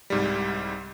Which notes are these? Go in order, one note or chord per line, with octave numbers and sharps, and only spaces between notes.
C2 G#2 G3